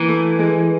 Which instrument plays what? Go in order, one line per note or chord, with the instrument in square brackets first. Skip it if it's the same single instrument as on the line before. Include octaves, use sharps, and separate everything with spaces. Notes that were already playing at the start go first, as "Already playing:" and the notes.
Already playing: [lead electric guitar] E3 [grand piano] A#3
[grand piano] A3
G#3